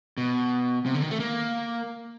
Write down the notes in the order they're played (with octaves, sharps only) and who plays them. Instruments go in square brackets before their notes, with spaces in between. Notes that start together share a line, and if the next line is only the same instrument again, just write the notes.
[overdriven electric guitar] B2
C3
D3
D#3
A3
A#3